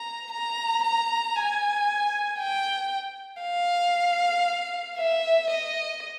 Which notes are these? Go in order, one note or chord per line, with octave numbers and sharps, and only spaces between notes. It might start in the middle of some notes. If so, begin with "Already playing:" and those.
Already playing: A#5
A#5
A#5
G#5
G5
F5
E5
D#5